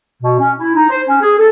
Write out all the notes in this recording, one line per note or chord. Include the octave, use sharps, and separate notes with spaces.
B2
C#4
E4
D#4
C5
C#4
G#4
A4